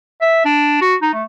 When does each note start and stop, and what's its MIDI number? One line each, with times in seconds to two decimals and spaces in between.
0.21 0.43 76
0.45 0.78 62
0.81 0.95 66
1.02 1.10 63
1.13 1.23 57